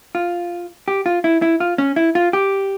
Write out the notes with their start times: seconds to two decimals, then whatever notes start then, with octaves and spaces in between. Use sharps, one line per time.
0.15 F4
0.88 G4
1.06 F4
1.24 E4
1.42 E4
1.60 F4
1.78 C#4
1.96 E4
2.15 F4
2.33 G4